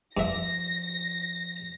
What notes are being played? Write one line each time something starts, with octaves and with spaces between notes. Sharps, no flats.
G2 F3 E5 A#6